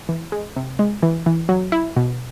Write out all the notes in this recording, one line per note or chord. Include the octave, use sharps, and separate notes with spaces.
E3
G#3
C3
G#3
E3
E3
F#3
E4
B2